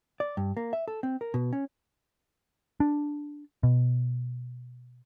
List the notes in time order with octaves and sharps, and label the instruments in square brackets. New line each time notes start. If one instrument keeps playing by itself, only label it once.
[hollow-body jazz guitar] D5
G2
A#3
E5
A4
C4
A#4
B2
C#4
[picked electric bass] D4
B2